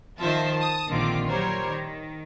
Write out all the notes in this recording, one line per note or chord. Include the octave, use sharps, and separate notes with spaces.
D#3 F3 F4 C5 E5 A5
A5 D#6
A#1 D3 D#3 C4 F4 D6
F#3 G3 A#4 C5 C#5
D#3